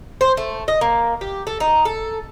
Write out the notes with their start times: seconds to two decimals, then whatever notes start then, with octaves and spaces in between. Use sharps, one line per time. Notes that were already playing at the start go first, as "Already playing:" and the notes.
0.21 C5
0.37 A3
0.68 D#5
0.81 A#3
1.21 G4
1.47 A4
1.60 D#4
1.85 A4